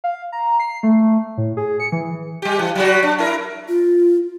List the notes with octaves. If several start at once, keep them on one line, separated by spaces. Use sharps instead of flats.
F5
A#5
C7
A3
A2
G#4
C#7
E3
G3 G4
E3
F#3 G3 F#4
D4
E4 A#4
F4